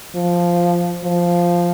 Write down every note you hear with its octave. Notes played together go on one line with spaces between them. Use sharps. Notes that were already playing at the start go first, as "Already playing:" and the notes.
F3
F3